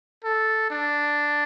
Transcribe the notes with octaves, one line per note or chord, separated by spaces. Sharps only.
A4
D4